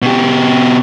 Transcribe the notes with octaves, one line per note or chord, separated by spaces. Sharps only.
B2 G4